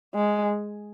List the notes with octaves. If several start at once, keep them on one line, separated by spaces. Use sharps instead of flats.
G#3